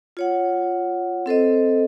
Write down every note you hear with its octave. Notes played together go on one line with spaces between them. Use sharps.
F4 C#5 F#5
C4 A4 C5 D#5